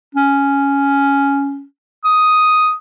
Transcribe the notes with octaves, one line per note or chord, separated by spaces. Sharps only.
C#4
D#6